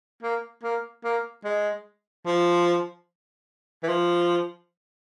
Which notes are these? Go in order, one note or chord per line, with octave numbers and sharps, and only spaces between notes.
A#3
A#3
A#3
G#3
F3
E3
F3